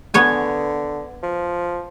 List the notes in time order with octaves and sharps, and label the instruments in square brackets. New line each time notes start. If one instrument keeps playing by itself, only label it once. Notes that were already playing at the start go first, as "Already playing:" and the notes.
[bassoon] D3 [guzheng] B3 C#5 G#5
[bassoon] F3